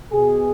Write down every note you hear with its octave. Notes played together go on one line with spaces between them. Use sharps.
B2 G#4